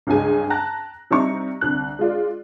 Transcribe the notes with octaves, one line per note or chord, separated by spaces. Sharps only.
C#2 G2 C#3 G#3 G#5
G5 A5 A#5 F#6 A#6
C3 G3 D#4 E5 A#5 C#6
C2 D3 F#6
G#3 F4 D5